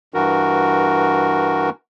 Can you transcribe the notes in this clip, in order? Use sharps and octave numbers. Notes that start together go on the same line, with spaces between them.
G2 E3 F#4 A#4